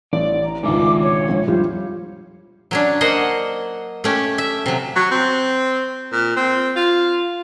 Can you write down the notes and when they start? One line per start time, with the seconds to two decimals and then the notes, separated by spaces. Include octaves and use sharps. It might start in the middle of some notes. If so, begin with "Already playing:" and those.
0.13 A1 D5
0.44 A#5
0.63 G#1 C#2 G#3 D4 E5 D6
1.02 C#5
1.29 A#1
1.47 F2 G3 F4 C5
2.71 F#3 C#4 D4
3.01 A#3 C5 D#5 F#5
4.04 A3 C#4 G4
4.38 E5
4.66 C3 F#3
4.95 F#3
5.11 C4
6.12 A#2
6.36 C4
6.76 F4